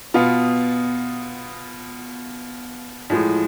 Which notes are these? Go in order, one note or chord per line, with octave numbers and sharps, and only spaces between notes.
B2 B3 F4
A2 F3 G#3